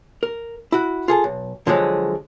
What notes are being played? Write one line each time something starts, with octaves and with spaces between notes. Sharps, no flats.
A#4
E4 F#4
F4 G#4 A4
B1
D3 F3 F#3 G#3